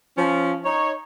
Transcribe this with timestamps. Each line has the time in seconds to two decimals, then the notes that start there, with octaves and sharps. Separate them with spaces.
0.18 F3 C#4
0.65 D#4 C#5